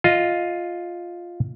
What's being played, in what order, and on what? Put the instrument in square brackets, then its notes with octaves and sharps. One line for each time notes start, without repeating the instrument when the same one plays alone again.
[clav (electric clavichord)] F4 D#5